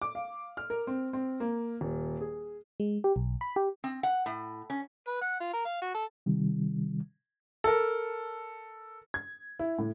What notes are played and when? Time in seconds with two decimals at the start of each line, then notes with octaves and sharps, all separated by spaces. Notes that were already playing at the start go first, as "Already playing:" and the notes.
0.02 D6
0.15 F5
0.57 F6
0.70 A#4
0.87 C4
1.13 C4
1.40 A#3
1.81 D#1
2.21 G#4
2.80 G#3
3.04 G4
3.16 B1
3.41 B5
3.56 G4
3.84 C4
4.03 F#5
4.26 A2
4.70 C#4
5.07 B4
5.22 F#5
5.40 F4
5.53 A#4
5.65 F5
5.82 F#4
5.95 A4
6.26 C3 D#3 G3
7.64 A4 A#4
9.14 G#6
9.59 E4
9.79 A2